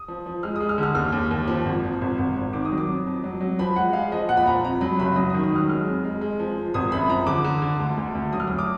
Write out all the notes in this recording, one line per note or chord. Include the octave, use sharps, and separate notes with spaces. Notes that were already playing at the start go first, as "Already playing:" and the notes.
Already playing: D#6
F3
F3
G#3 F6
G#3 D#6
F6
D3
F6
D#2 F6
D#2
D#2
F3
G#1
F3
G#1
G#1
G#1
D#3 D6
D#6
F#3
D6
F2
F2
F#3
F#3
F3 B5
G#3 F#5
G#3 F5
F3 D#5
A#2 F#5
B5
F3 A#5
F2 A#5
F#3 B5
F#1 B5
F#3 D#6
D#3 D#6
D#6
F#3 F6
G#3 F6
F2
G#3
G#3
F3
F3
G#1 D#6
F#2 B5
F3 A#5
D3 D6
D3
D3
D2
D2
D2
F#3 D#6
F6
D2 D#6
D6